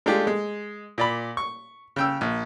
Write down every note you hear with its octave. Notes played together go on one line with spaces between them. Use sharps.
G#3 A3 D4 F4 G4
G#3
A#2 D5 B5
C#6
C#3 G5 E6
A#1